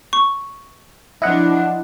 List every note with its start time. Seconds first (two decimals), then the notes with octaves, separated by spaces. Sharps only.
0.13 C#6
1.22 F3 D4 E4 D#5 F#5